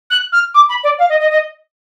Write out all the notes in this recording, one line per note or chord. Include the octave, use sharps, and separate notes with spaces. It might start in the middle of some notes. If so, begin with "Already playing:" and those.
F#6
F6
D6
B5
D5
F5
D#5
D#5
D#5